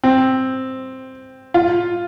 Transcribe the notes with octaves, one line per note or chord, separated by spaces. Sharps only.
C4
F4